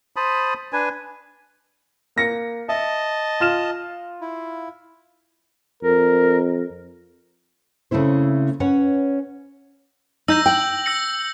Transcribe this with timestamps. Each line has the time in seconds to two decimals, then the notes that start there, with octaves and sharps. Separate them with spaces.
0.16 C5 A5 B5 D#6
0.73 D4 B4 G#5
2.16 A#3 A#6 C#7
2.69 D#5 E5 A5
3.40 F4 F6 E7
4.21 E4
5.83 F2 A#4
7.91 C#3 A3 C4 E4 C5
8.60 C#4 B4 C#5 F#5
10.28 D#4 E6 G6 A#6
10.46 G5 F#7
10.86 E6 A#6 C#7